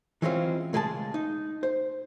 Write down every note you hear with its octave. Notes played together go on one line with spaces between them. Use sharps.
E3 F#3 G#3 C4 C#4 F4
C#2 G#3 G#4 G5 A5
D#4
C5